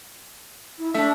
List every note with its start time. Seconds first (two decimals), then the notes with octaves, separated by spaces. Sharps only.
0.79 E4
0.94 A3 D4 E5